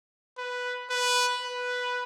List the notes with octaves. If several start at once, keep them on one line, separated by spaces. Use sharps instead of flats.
B4
B4
B4